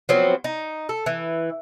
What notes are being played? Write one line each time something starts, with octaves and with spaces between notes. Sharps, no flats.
F3 F#3 B3 C4
D#4
A4
E3